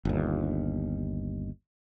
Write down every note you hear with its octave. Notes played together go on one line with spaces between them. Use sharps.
G1 D#2